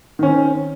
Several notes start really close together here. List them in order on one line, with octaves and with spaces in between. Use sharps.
D#3 C#4 C4